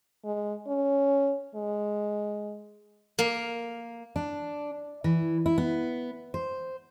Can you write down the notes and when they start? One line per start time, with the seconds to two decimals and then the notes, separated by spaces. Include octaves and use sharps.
0.25 G#3
0.67 C#4
1.55 G#3
3.19 A#3
4.16 D4
5.04 E3
5.46 E4
5.58 B3
6.34 C5